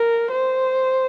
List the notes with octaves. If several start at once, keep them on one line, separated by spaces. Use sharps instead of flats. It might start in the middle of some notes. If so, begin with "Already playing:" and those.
Already playing: A#4
C5